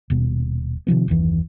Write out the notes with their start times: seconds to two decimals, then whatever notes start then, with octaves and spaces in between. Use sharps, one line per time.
0.10 D#1 B2
0.87 C3 D#3 F3 B3
1.08 F#1 D#2 E3